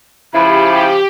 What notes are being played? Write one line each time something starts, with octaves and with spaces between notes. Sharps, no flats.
C#3 F3 E4 G4 B5